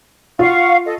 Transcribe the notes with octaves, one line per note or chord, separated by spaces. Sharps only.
F4 F5 F#5 C#6
A4 D#5